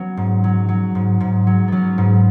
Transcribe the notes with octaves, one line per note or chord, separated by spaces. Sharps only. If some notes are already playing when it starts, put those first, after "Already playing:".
Already playing: F#3 B3 C#4
G#2
F#3
F#3
G#2
G#2
F#3
F#3 B3 C#4
G#2